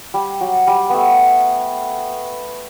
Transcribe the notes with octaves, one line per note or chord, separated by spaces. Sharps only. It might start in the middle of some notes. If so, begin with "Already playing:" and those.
G3
F#3
G3
A3 B3